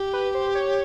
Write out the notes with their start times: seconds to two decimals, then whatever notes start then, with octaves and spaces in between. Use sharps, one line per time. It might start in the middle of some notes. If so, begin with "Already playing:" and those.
Already playing: G4
0.13 B4
0.35 C5
0.55 C#5